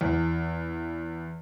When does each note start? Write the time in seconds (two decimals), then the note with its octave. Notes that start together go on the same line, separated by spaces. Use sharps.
0.01 E2